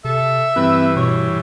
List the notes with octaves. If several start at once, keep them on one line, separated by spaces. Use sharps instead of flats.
C3 A4 E5
G2 E3 C4 B4
B2 C#5